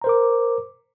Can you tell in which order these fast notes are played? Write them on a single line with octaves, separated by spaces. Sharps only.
A#5 C5 A#4 D6